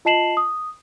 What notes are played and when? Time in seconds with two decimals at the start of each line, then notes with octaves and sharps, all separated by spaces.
0.05 F4 D#5 A5 C7 E7 F#7
0.37 D#6